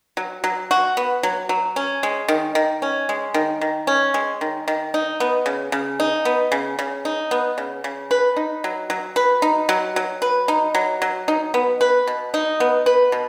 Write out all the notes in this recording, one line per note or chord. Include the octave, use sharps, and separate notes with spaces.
F#3
F#3
F#4
B3
F#3
F#3
C#4
G#3
D#3
D#3
C#4
G#3
D#3
D#3
C#4
G#3
D#3
D#3
D#4
B3
C#3
C#3
D#4
B3
C#3
C#3
D#4
B3
C#3
C#3
B4
D#4
F#3
F#3
B4
D#4
F#3
F#3
B4
D#4
F#3
F#3
D#4
B3
B4
B2
D#4
B3
B4
B2